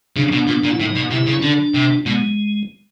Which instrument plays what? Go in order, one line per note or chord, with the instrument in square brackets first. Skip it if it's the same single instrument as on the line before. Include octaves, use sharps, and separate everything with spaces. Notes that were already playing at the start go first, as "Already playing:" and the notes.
[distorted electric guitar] C#3 [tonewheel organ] D4
[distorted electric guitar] B2
A#2
A#2
[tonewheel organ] E4
[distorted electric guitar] A2 [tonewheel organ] D#4
[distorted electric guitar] B2
[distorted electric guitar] C3 [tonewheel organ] E4
[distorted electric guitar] C#3
[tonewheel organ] C#4
[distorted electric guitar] D3 [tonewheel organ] D4
[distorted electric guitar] C3
[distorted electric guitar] B2 [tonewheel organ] G#3